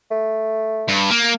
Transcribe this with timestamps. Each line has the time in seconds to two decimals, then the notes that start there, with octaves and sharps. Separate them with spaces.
0.11 A3
0.89 G2
1.11 A#3